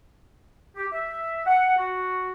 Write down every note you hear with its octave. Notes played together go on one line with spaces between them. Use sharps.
G4
E5
F#5
F#4